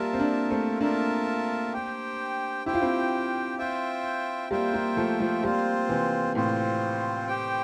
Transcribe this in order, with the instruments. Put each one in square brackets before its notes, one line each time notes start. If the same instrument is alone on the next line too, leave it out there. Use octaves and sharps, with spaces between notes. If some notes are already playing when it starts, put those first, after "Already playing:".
Already playing: [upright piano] G3 A#3 [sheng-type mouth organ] F4 A#4 E5 A5
[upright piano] C4
A#3 D4
A3 C4
[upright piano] A#3 D4 [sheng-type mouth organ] F4 A#4 E5 A5
[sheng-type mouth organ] G4 C5 G5
[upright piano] E4 [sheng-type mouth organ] G4 C5 G5
[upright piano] F4
C4 E4
[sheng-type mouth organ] F4 C5 E5 G5
[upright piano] G3 A#3 [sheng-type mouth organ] F4 C5 E5 G5
[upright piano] G3 A#3
F3 A3
F3 A3
[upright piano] G3 A#3 [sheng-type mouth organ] C4 F4 C5
[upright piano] C3 E3
[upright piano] A2 C3 [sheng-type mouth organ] C4 F4 C5
[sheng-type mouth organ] G4 C5 G5